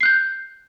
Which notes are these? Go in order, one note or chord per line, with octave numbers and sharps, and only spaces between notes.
F#6 G6 C7